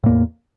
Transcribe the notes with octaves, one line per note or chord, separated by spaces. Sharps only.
E2 A2 A#3